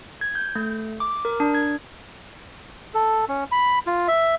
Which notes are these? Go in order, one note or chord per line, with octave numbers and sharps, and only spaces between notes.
G#6
G6
A3
D6
A#4
D4
G#6
A4
C#4
B5
F4
E5